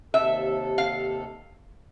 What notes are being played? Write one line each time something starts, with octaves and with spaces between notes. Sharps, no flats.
D#2 C3 A4 E5
F5